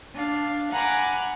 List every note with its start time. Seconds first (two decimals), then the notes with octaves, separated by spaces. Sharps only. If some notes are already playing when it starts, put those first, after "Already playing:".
0.14 D4 F5
0.72 F#5 G#5 A#5 B5 D6